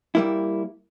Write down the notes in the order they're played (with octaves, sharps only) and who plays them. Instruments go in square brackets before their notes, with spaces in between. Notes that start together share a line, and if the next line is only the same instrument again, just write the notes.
[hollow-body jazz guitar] G3 A#3 E4